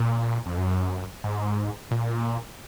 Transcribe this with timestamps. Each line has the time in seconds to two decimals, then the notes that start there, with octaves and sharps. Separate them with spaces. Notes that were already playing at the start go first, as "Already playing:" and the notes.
Already playing: A#2
0.46 F2
0.58 F#2
1.24 G#2
1.91 A#2